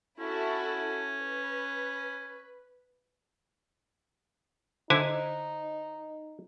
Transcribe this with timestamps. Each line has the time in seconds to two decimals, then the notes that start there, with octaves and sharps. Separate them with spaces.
0.19 C#4 E4 F#4 A4
1.21 B4
4.90 D3 D#4 E4 C5 G#5